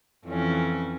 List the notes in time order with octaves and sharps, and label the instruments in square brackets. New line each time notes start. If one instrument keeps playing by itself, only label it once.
[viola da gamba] F2 E3 C#4